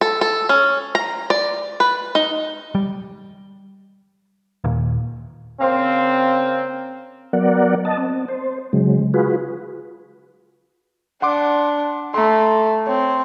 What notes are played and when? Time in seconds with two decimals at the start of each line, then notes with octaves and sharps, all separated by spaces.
0.01 A4
0.21 A4
0.49 C#4
0.95 A#5
1.30 D5
1.80 B4
2.15 D#4
2.75 G3
4.64 D#2 A#2
5.61 C#3 A#3 C4
7.33 F#3 B3 A#4 D5 F#5
7.85 D#5 A5
7.98 C4
8.28 C5
8.73 C#3 F#3 G#3
9.14 F4 F#4 G#4 B4
11.22 D4 F#5 C6 D6
12.14 A3 A#5 C6
12.87 C4 C#5